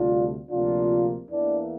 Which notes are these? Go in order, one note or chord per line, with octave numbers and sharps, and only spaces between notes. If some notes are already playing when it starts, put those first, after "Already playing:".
Already playing: D2 C3 G3 D4 F4
D2 C3 F3 A#3 D4 F4
E2 E3 A#3 D4